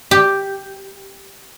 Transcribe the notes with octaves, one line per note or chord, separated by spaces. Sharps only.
G4